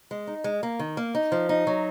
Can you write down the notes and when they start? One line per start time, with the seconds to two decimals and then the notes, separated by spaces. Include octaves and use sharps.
0.11 G#3
0.27 D#4
0.44 G#3
0.63 A#3
0.79 D#3
0.97 A#3
1.15 D#4
1.32 F3
1.49 D#4
1.67 F#3